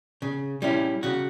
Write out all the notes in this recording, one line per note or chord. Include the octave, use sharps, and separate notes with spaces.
C#3
G3 C#4 E4
C#3 F#4